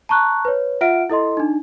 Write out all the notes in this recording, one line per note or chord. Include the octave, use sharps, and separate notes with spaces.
A5 A#5 C#6 F#6
B4 C#5
F4 E5 F#5 F6 D7
E4 A4 D#5 C6
D4 D#4